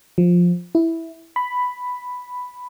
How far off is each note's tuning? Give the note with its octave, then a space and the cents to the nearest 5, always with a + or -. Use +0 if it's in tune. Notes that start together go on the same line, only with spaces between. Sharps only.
F3 +10
E4 -5
B5 +5